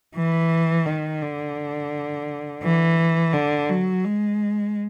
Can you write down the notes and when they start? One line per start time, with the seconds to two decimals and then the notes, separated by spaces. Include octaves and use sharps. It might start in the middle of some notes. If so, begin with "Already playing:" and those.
0.15 E3
0.86 D#3
1.22 D3
2.63 E3
3.34 D3
3.69 F#3
4.05 G#3